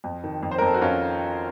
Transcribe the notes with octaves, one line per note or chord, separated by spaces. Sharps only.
F2
D#3
F2
C5
A#4
F2 A4
F#4
F2 C#4 F4